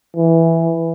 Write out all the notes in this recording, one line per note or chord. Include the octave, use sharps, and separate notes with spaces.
E3